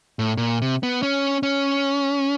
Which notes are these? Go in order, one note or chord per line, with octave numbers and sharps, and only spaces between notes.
A2
A#2
C3
B3
C#4
C#4